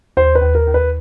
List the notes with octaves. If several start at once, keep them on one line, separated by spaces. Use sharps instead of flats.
D#2 C5
B4
D#2
A#4
D#2
B4